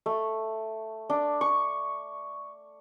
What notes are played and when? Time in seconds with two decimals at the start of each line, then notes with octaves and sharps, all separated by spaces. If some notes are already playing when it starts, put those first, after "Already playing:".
0.06 A3
1.10 D4
1.41 C#6